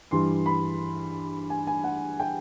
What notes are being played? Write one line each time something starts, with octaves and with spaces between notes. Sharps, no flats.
G2 E3 G3 C6
B5
G#5
G#5
F#5
G5